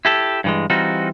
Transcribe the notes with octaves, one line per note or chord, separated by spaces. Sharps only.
E4 G4 A4
G2 E3 G#3
E3 G3 C4 D#4 F4 F#4